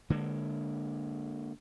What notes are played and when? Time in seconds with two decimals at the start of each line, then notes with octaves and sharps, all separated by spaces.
0.10 D3 G#3 A#3